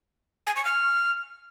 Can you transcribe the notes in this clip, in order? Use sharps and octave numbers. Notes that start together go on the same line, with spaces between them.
G#5
C#6
F6